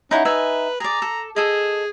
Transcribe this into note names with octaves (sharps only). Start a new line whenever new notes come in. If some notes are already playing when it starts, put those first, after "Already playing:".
C#4 D#4 E4 F#5
D#4 B4 E5 G#5
G#4 D5 A#5
A4
G#4 A4 D#5